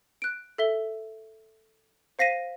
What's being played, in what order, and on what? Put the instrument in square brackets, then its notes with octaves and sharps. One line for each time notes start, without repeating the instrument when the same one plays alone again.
[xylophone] F#6 D7
A4 E5 G7
C5 F5 A#6 B6 D#7